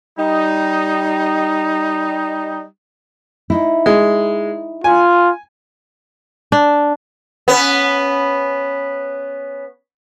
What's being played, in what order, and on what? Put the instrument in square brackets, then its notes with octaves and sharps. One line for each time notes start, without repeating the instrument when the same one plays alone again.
[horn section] G3 D#4
[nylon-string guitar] D#4 E4
[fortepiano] G#3
[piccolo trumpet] F4 [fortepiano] G#5
[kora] D4
[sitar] B3 C#4